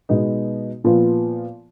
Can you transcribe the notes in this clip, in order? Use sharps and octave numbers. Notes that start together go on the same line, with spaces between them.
B2 G#3 B3 D#4
A#2 F3 B3 F4